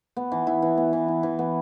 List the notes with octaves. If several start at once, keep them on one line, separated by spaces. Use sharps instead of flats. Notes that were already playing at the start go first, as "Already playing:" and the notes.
B3
E3
E4
E3
B3
E3
E4
E3
B3